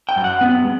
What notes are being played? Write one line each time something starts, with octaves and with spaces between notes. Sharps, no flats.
G5
F#2
F#5
B3
G#3